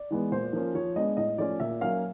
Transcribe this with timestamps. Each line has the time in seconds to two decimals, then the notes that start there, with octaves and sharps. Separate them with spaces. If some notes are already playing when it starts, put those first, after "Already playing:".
Already playing: D5
0.11 E3 G#3 B3
0.32 A#2 C5
0.53 F3 A#3 C#4
0.75 F3 C#5
0.96 G#3 B3 D4 D#5
1.17 A2 D#5
1.38 F3 A3 C#4 D5
1.60 A#2 E5
1.81 F#3 A#3 C#4 F5